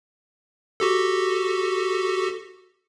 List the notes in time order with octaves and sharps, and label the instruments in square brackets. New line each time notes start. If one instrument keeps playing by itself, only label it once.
[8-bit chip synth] F#4 G4 A4